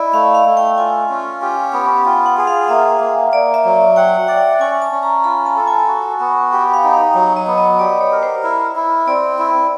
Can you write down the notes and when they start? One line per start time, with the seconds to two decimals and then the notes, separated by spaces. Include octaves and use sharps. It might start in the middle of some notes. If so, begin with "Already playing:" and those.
Already playing: E4 D5 D#5
0.14 A3 F5
0.35 F5
0.46 A3
0.57 G5
0.78 F4 G#5
1.09 C#4
1.42 G4
1.73 B3
2.05 F4 G5
2.26 F#5
2.37 G#4
2.47 F5
2.69 A#3 E5
3.00 A#3
3.33 A#3 D5
3.54 E5
3.65 F#3
3.96 F#5 G5
4.28 D5 G5
4.60 C#4 G#5
4.82 A5
4.92 C#4
5.03 A#5
5.24 F4 B5
5.46 A5
5.56 A4
5.67 G#5
5.88 F#4
6.20 B3
6.52 G4 G5
6.74 F5
6.84 D#4
6.94 F5
7.15 F#3
7.36 D#5
7.48 B3
7.58 D#5
7.79 G4 D5
8.01 C#5
8.12 A#4
8.23 C5
8.44 E4
8.76 E4
9.07 C4 D5
9.39 E4